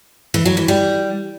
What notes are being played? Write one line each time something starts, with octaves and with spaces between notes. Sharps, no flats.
E3
F#3
E3
G3